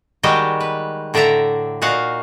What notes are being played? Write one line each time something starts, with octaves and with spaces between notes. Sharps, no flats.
D#3 G3 G#3 F#4 G4 D#5
B4
A2 D3 D5 E5 A#5
A#2 D#4 F#4 F5 F#5